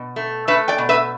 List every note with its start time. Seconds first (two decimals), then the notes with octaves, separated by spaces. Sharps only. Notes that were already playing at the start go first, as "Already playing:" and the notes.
Already playing: B2
0.16 A3
0.48 A3 B4 E5
0.68 D5 G5
0.78 B2
0.89 B4 E5